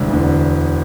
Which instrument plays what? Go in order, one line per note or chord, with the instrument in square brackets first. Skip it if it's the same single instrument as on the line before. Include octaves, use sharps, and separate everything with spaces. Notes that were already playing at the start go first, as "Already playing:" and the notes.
Already playing: [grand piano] E1 D2 D3
E1 D2 D3